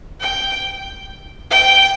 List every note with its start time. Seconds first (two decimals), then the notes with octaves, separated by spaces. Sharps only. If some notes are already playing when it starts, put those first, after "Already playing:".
0.20 G5
1.50 G5